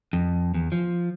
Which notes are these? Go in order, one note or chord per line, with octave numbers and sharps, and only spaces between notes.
F2
E2
F3